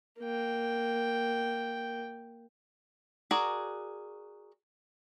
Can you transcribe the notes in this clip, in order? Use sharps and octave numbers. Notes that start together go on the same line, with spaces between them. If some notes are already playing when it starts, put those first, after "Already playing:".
A#3 G5
F#4 G#4 A#4 D5